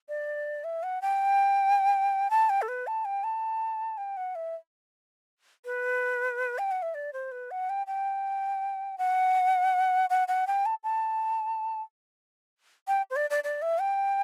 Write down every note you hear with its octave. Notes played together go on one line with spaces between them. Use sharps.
D5
E5
F#5
G5
A5
G5
A4
B4
A5
G5
A5
G5
F#5
E5
B4
G5
F#5
E5
D5
C5
B4
F#5
G5
G5
F#5
F#5
F#5
G5
A5
A5
G5
C5
D5
D5
D5
E5
G5